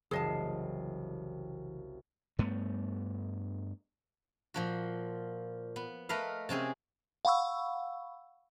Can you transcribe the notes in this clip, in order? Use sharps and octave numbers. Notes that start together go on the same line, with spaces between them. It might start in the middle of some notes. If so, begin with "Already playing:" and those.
F#1 C2 C#3 E3 G#4 D#5 A5 C7
G2 A3 B3
A#2 F3 F#4
B3
A3 A#4 B4 D#5 F5
C3 C4 C#4 G#4
F5 F#5 B5 C#6 E6